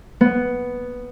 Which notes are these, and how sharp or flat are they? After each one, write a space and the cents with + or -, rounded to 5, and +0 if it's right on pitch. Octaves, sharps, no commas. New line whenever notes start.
B3 +0